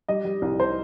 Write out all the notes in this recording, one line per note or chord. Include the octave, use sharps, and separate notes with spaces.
G3 D#5
G3
C2
C5